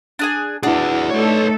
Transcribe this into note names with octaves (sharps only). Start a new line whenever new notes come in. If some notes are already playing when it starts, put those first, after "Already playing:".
D4 G#4 G#5
D4 E4 F#4 G#4 B4
A3 D#4 A4 B4 C#5